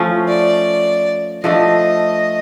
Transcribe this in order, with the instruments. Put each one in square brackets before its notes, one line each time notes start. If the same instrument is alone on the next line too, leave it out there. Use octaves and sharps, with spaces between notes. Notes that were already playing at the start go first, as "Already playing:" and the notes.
Already playing: [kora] F3 A3 C#4
[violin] D5
[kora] F3 A3 D4 [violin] D#5